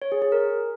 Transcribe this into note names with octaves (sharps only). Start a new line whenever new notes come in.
C#5
G#4
G#4
A#4